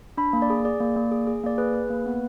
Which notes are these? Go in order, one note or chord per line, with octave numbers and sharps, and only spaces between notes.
D4 B5
A#3
D5
G#4
G#4 D5
A#3
A#3
G#4
G#4
A#3 D5
G#4 B4
G#4
A#3
B3